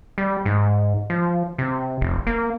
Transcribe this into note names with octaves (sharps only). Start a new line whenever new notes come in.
G3
G#2
F3
C3
F1
A#3